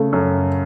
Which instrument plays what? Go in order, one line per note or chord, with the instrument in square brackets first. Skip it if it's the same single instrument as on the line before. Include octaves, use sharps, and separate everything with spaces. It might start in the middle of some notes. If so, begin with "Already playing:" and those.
Already playing: [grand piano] C#3 [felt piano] A3
[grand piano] F#2